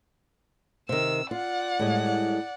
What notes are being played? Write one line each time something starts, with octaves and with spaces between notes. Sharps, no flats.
C3 D#3 E6
F4 D5 F#5
A2 G3 G#3